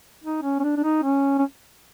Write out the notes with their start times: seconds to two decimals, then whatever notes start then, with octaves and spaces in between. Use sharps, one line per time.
0.24 D#4
0.43 C#4
0.60 C#4
0.63 D4
0.77 D4
0.84 D#4
1.03 C#4
1.39 C#4